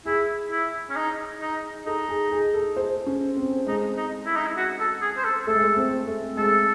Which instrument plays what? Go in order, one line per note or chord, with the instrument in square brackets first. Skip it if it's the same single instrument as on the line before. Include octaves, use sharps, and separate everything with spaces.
[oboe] E4 [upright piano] G#4
[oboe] E4
C#4
D#4
D#4
[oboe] D#4 [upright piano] A4
[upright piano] G#4
G#4
A4
C5
C#4
C4
[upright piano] G#3 [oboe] D#4
[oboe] D#4
E4
D#4
E4
F#4
A4
G#4
C5
A4
[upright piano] A3 [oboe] A4
[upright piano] G#3
A3
C4
A3
[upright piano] G#3 [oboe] A4